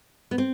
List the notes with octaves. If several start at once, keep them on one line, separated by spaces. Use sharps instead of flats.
B3
C4